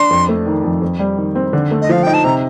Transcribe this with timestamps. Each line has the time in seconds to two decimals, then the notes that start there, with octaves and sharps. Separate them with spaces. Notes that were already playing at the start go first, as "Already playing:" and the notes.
Already playing: D4 C6
0.11 F2
0.29 A3
0.46 D#3
0.64 F2
0.82 F2
0.99 G3
1.17 D#3
1.35 C4
1.53 D3
1.71 A3
1.82 D#5
1.89 F3 F5
2.03 D#4 G5
2.14 A5
2.24 C3 A#5